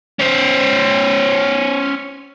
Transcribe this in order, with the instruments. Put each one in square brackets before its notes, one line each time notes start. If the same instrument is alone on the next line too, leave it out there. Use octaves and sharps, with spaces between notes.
[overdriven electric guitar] C#4 C5